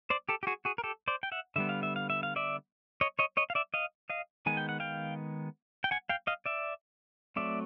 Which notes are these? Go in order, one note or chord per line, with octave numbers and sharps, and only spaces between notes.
C5 D5
G4 A4
G4
F#4 G#4
F#4 G#4
A#4
G4 A4
C5 D5
G5
E5 F#5
D3 G3 B3 E5
F5
E5
F5
E5
F5
D5 E5
C#5 D#5
C#5 D#5
C#5 D#5
F5
D5 E5
D#5 F5
D#5 F5
D#3 G#3 B3 G#5
G5
F#5
F5 G5
G5
F#5 G#5
F5 G5
D#5 F5
D5 E5
F#3 A3 C4 D5 E5